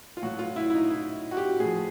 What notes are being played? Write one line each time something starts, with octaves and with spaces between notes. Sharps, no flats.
F4
A2 F#3 F#4
F4
E4
E4
D#4
E4
F#4
G4
A2 F3 G#4